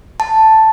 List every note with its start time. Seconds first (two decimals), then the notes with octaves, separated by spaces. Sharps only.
0.20 A5